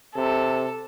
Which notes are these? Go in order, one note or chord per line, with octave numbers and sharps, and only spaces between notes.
C3 A4